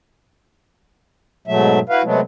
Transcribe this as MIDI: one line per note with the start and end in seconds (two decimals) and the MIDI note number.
1.47 1.79 44
1.47 1.79 47
1.47 1.79 54
1.47 1.79 57
1.47 1.79 76
1.89 2.02 64
1.89 2.02 66
1.89 2.02 71
1.89 2.02 77
2.03 2.21 48
2.03 2.21 54
2.03 2.21 56
2.03 2.21 57
2.03 2.21 59